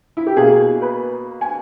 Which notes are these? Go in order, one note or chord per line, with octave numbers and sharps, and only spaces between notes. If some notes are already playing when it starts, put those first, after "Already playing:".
E4
G4
B2 A#3 G#4
B4
G#5